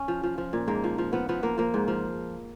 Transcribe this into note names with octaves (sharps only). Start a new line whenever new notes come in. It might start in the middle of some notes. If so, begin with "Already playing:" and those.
Already playing: C#4
F3
F3
F3
A#2
G#2 A#3
F3
F3
F3 B3
F3 B3
F3 A#3
F3 A#3
G#2
F3